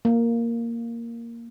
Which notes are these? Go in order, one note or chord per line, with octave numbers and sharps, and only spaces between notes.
A#3